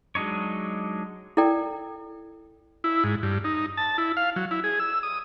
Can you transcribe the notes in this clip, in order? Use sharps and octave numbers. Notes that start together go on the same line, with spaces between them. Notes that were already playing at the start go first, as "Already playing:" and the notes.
F#3 G#3 D4 D#4 C#5
E4 A4 A#4 D5 G5
E4
G#2
G2
D#4
A5
E4
F5
F#3
E4
G#4
E6
D#6